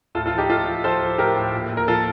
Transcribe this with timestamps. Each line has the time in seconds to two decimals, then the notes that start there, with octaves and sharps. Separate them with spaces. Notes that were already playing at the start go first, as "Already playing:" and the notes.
0.15 A2 F4 A4
0.26 F4 A4
0.33 F3
0.38 D#4 G4
0.49 A2 F4 A4
0.67 F3
0.84 F3 A4 C5
1.02 F3
1.18 A2 G4 A#4
1.37 A2
1.54 A#2
1.71 A#2
1.77 A#4
1.88 F3 F4 A4